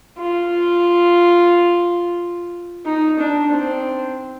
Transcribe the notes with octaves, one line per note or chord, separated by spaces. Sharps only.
F4
D#4
D4
C4